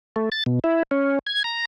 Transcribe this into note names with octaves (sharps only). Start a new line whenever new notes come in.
A3
A6
B2
E4
C#4
G#6
A#5